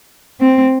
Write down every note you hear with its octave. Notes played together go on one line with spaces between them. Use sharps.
C4